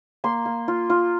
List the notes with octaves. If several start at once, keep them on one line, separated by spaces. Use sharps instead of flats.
A#3 C6
A#3
F4
F4